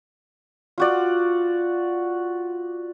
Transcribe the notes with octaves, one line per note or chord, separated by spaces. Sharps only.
F4 F#4 D5